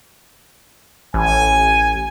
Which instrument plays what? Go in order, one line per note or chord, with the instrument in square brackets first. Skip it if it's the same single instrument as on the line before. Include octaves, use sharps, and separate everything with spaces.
[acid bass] A1 [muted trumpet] G#5